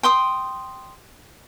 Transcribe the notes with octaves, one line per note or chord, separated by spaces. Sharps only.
G5 C6 D#6